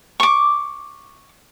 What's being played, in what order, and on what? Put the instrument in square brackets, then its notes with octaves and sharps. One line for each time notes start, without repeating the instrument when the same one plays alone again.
[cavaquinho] C#6 D6